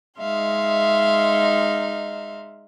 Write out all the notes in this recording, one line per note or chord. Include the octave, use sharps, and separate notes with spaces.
G#3 D#4 E5 F5 C6